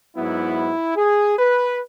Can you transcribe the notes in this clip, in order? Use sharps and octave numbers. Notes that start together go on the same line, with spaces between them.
G#2 F#3 B3 E4
G#4
B4